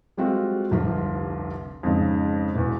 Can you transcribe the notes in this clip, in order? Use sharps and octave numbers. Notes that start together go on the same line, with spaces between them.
G3 G#3 C4 F4 F#4 A4
F1 C2 G2 D3 F3 F4
F2 G#2 C#3
E1 E2